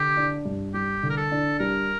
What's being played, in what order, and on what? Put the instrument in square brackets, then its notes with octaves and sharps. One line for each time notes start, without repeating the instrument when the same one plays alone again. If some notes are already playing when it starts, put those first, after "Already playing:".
Already playing: [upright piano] D3 [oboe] G4
[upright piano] D4
G2
[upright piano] G3 [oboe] G4
[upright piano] D3
[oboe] A#4
A4
[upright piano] D4
[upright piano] G3 [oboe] A#4